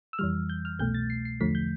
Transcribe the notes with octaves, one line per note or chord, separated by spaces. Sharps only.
E6
F2 E3 G3 F6
G6
F6
C2 B2 A3 G6
A6
C7
C7
E2 D3 F3 A3 B6
G6